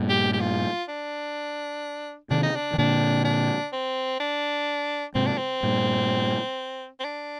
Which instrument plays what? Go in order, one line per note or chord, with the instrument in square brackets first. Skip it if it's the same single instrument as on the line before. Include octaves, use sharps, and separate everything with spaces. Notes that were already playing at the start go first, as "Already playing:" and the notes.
Already playing: [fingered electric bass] G2 A#2
[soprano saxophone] G4
G4
F4
D4
[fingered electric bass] C3 D#3 [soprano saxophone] D4
[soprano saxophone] D#4
D4
[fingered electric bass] D#3
[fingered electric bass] A#2 D3 [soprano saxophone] D4
[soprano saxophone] D4
C4
D4
[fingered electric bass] G#2 C3 [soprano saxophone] C4
[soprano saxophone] D4
C4
[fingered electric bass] G2 A#2
[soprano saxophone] C4
D4